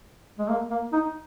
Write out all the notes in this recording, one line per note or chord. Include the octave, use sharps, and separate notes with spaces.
G#3
A#3
A#3
D#4